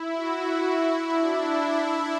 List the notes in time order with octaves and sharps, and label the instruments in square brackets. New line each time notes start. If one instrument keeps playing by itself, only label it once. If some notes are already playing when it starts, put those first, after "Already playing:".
Already playing: [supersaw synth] E4
F#4
E4
D4
E4